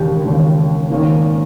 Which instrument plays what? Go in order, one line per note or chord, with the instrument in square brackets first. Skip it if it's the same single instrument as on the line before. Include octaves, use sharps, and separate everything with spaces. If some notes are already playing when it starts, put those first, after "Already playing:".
Already playing: [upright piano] E1 D#2 C#3 [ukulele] G4
[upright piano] E1 D#2 C#3
G#1 G#2 D#3 A#3 C#4